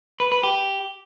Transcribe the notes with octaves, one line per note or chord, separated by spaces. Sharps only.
B4
B4
G4